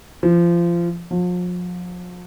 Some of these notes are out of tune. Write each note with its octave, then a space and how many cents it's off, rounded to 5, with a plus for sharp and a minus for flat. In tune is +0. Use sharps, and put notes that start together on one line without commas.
F3 -25
F3 +40